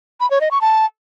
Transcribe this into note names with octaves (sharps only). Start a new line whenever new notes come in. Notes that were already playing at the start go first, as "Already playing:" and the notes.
B5
C#5
D#5
C#6
A5